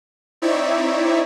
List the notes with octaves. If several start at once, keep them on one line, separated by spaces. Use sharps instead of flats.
C4 D#4 E4 C#5 D5 E5